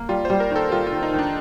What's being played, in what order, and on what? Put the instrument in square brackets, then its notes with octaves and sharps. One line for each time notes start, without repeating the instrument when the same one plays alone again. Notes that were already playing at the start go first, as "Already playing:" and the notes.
Already playing: [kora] A#3
[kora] G3 [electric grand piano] F4
[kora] G3 [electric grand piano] C5
[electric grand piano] A#4
[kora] D#3
[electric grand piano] A4
[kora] G3 [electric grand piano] F4
[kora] D#3 [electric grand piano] F4
[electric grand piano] D#4
[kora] D#3
[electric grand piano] D4